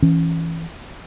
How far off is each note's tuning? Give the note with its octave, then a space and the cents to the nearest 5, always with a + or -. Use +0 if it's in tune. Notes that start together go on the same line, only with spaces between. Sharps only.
E3 +0 C#4 +0